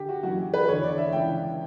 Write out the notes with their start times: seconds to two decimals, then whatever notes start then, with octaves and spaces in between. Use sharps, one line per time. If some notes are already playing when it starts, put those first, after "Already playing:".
Already playing: D3 G4
0.09 F#4
0.23 F#2 E3 F#4
0.54 B4
0.68 E2 C#5
0.72 D3
0.83 D5
0.98 E5
1.12 C#2 C#3 E3 G5